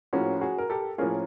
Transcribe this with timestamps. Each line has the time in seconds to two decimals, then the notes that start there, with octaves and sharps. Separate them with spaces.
0.13 A2 F3 A#3 C#4 F#4 G#4
0.41 F#4 G#4
0.58 A#4
0.70 G4 A4
0.98 A2 F3 A#3 C#4 G#4 A#4